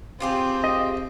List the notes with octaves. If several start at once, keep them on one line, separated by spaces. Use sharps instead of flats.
C4 F4 G4 G#4
D#5